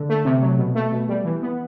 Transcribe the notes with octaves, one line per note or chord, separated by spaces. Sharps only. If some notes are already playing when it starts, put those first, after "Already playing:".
Already playing: D3
A3
C3
F#3
B2
A3
B2
G3
E3
B3